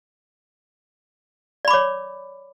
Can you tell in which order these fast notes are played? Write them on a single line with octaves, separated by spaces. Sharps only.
D5 B5 D6 C#5